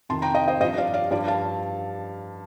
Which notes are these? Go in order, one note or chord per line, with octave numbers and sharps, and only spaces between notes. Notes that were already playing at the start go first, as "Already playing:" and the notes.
F2 C3 D#3 A5 C6
G5 A#5
D#5 G5
C5 D#5
G2 F3 C5 D#5
D5 F5
D5 F5
G2 F3 D5 F5
F5 A5